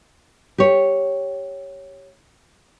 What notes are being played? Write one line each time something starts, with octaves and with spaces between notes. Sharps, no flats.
G4 C#5